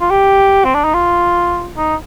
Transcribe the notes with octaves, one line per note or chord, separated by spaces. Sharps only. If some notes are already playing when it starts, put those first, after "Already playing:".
F4
G4
C4
D4
D#4
F4
D#4